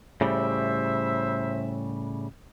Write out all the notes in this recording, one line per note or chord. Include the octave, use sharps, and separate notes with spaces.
A2 C#3 G3 C5 E5